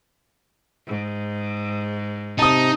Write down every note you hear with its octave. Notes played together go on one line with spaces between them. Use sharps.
G#2
C3 D#4 A5 D#6